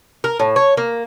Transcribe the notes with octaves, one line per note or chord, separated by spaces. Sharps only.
A#4
A2
C#5
A#3